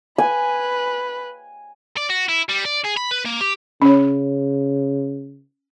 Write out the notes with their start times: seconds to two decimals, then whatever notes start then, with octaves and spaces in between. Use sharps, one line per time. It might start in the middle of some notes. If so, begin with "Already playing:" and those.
0.18 B4 G#5
1.97 D5
2.10 F#4
2.29 E4
2.49 G3
2.65 D5
2.84 G#4
2.97 B5
3.11 B4
3.25 A#3
3.41 G4
3.82 C#3 C#4 C#5